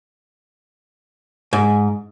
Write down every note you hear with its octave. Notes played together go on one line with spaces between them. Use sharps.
G#2